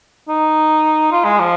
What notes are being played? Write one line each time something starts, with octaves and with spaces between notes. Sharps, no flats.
D#4
F4
G#3
F3